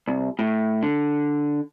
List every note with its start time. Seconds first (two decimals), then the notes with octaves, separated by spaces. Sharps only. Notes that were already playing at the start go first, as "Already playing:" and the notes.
0.07 C2
0.39 A2
0.83 D3